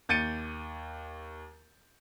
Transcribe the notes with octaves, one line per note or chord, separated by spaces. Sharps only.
D#2 G6 A6 C#7 D#7